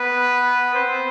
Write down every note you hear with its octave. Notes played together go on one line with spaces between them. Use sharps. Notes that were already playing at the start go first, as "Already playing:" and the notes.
Already playing: B3 B4
C4 C5